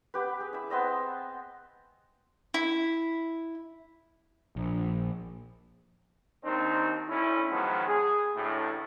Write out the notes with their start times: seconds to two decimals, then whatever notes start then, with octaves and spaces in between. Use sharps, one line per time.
0.14 B3 G4 B4
0.40 G#4
0.53 E4 E5
0.70 B3 C4 D#5 E5
2.54 E4
4.56 A#1
6.45 D#2 D#3 C4 D4 D#4
7.09 D2 A2 C#4 E4
7.51 D#3 F3 F#3 G#3 B3
7.88 G#4
8.36 A1 D2 A2